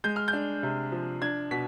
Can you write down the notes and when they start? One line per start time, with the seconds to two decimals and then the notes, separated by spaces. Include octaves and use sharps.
0.04 G#3 G6
0.16 F6
0.28 G6
0.33 D4
0.63 C3
0.92 F3
1.22 D4 G#6
1.51 B2 B6